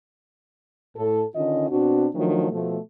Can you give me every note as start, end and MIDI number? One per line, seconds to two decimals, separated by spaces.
0.97 1.22 45
0.97 1.22 69
1.36 1.71 50
1.36 1.71 51
1.36 1.71 61
1.36 1.71 65
1.36 1.71 75
1.71 2.07 47
1.71 2.07 60
1.71 2.07 62
1.71 2.07 66
2.15 2.51 51
2.15 2.51 53
2.15 2.51 54
2.15 2.51 57
2.15 2.51 62
2.51 2.78 47
2.51 2.78 53
2.51 2.78 57